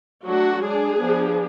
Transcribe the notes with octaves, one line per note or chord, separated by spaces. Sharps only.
F#3 A3 D4 F#4
G#3 D4 G#4
F3 B3 D4